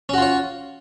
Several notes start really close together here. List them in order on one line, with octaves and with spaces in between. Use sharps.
C#4 F#4 F4 C#5